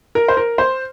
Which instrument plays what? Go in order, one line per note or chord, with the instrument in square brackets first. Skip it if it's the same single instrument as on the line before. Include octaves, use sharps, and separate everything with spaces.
[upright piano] A#4
C5
A#4
C5